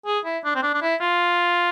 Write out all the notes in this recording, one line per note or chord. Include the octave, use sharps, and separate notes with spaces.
G#4
E4
D4
C4
D4
D4
E4
F4